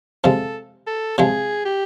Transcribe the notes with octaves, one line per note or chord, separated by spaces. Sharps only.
C3 F3 G#3 A4
A4
C3 F3 G#3 G#4
G4